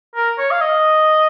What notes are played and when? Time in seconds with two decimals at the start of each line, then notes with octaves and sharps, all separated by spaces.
0.15 A#4
0.38 C#5
0.51 F5
0.61 D#5